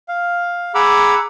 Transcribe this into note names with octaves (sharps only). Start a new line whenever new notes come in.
F5
G#4 F#5 A#5 B5 D6 E6